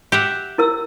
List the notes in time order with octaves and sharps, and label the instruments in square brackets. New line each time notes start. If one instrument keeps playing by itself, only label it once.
[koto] G4 E5 F#5
[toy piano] E4 A#4 E6